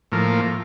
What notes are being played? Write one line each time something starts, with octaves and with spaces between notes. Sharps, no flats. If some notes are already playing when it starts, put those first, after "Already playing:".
A2 F3 A#3